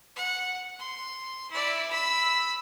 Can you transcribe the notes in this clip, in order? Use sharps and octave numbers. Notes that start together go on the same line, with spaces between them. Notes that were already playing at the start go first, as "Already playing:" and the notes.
F#5
C6
E4 D5
B5 E6